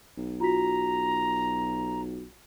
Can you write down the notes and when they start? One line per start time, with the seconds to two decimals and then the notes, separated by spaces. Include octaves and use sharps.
0.18 B1
0.40 F4 F#4 A#5 B6